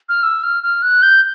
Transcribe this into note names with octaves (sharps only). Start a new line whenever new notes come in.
F6
E6
F6
F6
F#6
G6